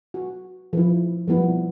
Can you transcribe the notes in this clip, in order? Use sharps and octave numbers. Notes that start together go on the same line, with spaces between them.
F#4
F3 E4
F3 G3 B3 E4